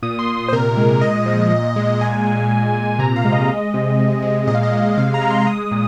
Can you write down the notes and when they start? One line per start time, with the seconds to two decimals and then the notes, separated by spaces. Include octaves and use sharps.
0.03 A#2 D#6
0.19 C6
0.28 A#2
0.49 C5
0.52 C3 A#4
0.77 G#3
1.01 A#2 D#5
1.26 F3
1.51 A#2
1.76 G#3
2.00 A#2 G#5
2.26 G#3
2.51 A#2
2.74 A#2
2.99 C3 A#5
3.16 F5
3.25 G#3
3.32 D#5
3.48 G#3
3.74 C3
3.99 G#3
4.22 G#3
4.47 A#2 D#5
4.55 F5
4.63 D#5
4.73 G#3
4.97 C3 F5
5.14 A#5
5.21 G#3
5.31 C6
5.46 G#3 D#6
5.72 A#2